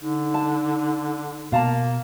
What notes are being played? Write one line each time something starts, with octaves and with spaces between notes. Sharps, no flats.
D3 D#4
A5
B2 A#3 F5 A5 A#5